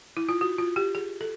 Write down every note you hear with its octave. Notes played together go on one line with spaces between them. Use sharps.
E4
F4
F#4
F4
G4
G#4
A4